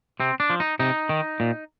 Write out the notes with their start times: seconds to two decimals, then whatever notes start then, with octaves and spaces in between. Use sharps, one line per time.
0.20 C3 C4
0.40 D4
0.50 F3
0.60 D#4
0.79 C3 D#4
1.09 D#3
1.40 A#2